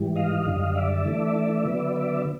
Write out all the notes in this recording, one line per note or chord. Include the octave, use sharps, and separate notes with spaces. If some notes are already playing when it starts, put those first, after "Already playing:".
Already playing: G#2 E3 G3
D#5 F5
F#2 D3 G3
D5 E5
E3 A3 D4
D3 F#3 B3
D5 E5